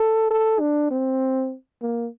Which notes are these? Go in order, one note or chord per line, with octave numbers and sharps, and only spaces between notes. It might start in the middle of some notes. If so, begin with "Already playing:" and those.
Already playing: A4
A4
D4
C4
A#3